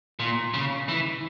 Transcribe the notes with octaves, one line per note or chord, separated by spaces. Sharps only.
A#2
C#3
E3